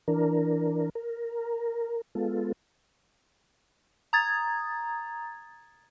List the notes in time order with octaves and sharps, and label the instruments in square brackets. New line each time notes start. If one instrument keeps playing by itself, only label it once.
[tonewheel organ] E3 D4 A#4
A#4
G#3 B3 F4 A4
[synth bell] A#5 D#6 G#6 A6